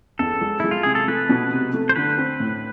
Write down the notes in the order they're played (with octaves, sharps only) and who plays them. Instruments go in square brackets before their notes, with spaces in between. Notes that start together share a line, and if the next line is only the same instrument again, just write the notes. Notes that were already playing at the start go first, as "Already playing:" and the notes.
[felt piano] E2 [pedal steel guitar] A4
[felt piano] G#3
[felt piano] G#3 [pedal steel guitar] E4
[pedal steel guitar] F4
[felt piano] C3 [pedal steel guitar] G#4
[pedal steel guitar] A4
[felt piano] A3 [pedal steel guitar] B4
[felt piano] B2
C3
A3
[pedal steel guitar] C5
[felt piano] D3 [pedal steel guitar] B4
[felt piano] C4
A2